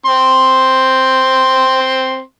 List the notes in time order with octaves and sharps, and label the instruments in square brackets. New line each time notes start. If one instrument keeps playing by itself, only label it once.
[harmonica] C4 C6